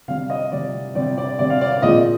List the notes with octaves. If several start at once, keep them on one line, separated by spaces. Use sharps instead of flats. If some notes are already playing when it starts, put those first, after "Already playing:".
C3 G3 C4 F5
D#5
C3 G3 C4 D5
C3 G3 C4 D5
D5
C3 G3 C4 D5
F5
D5
D5
A#2 F3 G#3 C4 D#5